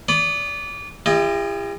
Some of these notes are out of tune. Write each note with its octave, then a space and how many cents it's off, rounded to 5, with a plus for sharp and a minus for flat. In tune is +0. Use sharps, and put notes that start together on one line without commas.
D5 -25 B5 +30 D#6 -30
E4 +45 G4 +45 D#5 +0